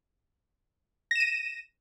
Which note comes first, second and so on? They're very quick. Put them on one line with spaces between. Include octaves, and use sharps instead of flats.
A#6 E7 D#7